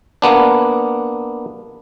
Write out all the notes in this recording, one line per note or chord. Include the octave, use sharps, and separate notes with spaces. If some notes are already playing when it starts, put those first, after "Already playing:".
A#3 B3 D4